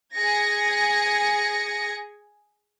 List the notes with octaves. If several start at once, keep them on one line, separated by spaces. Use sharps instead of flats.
G#4 G#5 G#6 A#6 C#7